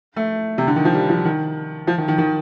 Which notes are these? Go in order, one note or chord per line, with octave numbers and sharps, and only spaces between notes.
A3
C3
D3
D#3
F3
G3
F3
D#3
F3
D#3
D#3
D#3